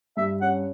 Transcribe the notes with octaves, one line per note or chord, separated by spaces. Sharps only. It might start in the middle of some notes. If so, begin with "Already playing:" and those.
G2 E5
C#4 F#5